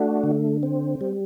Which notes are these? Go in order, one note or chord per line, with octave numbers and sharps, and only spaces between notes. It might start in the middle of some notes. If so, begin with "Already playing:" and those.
Already playing: A3 D4 F#4
D3
C4
G3